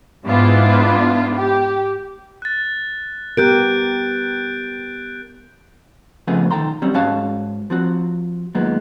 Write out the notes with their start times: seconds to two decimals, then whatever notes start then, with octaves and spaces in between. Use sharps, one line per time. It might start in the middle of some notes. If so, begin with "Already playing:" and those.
0.25 G#2 B3 D4 E4 F4
1.35 G4
2.42 F#6 A6
3.37 B3 G4 A#4 F#6 G6 D7
6.28 F2 C#3 F3 A3 B3 G#4
6.51 B1 D#3 A4 G5 A#5 C6
6.82 F#3 G3 C4 C#4
6.94 G#2 G#3 C#4 F#4 F5 A5
7.70 F3 C4 F#4
8.55 A#2 D#3 F#3 G#3 B3